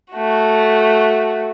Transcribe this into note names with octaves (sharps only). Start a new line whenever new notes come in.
A3 F#4